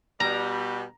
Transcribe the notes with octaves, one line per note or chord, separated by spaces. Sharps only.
B2 G3 A#5